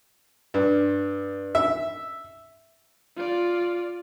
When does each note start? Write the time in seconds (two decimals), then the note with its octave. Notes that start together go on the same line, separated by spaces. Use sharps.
0.54 G2
1.55 E5
3.17 F4 D5